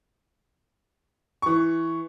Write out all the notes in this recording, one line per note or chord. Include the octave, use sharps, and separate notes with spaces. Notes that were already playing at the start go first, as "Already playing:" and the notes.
E3 C#6